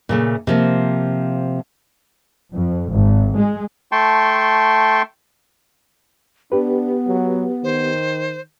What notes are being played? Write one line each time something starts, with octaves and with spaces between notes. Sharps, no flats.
A#2 C#3 A3
C3 F3 A#3
F2
G#1
G#3
A3 G5 A5 C6 C#6
B3 D4 G4 B4
F#3
D#3 C5